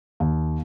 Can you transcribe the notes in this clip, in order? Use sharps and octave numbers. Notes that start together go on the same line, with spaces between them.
D#2